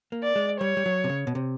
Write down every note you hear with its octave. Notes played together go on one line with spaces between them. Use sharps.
A#3
D5
G#3
G3 C#5
G3
F#3
C3
C#3
B2
C3